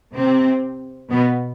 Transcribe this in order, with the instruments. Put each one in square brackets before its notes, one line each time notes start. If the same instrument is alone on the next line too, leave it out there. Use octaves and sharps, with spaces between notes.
[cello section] C3 C4
B2 B3